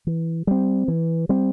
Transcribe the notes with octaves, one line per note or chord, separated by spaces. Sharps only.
E3
G3 C4
E3
G3 C4